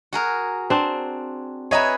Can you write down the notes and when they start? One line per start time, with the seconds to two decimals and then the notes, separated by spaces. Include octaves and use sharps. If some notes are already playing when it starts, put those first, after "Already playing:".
0.13 F#4 G#4 A#4
0.70 C4 D4
1.71 G#4 B4 C#5 D#5 E5 A#5